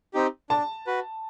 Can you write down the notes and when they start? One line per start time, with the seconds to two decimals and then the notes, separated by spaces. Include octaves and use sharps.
0.14 C4 D#4 G4
0.50 D4 A5
0.87 F#4 B4